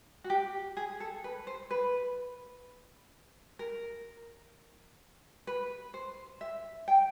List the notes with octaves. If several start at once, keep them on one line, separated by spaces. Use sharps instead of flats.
F#4
G4
G#4
A4
B4
C5
B4
A#4
B4
C5
E5
G5